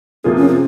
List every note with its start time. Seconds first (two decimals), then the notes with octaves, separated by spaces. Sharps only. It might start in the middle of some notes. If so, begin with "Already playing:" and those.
0.24 C3 F3 A#3 C4 F4 G#4
0.36 C#4
0.48 C4